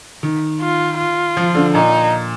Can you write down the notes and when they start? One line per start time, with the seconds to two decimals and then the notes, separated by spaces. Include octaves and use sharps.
0.23 D#3
0.61 F4
0.98 F4
1.37 F3
1.55 D3
1.73 A#2 D#4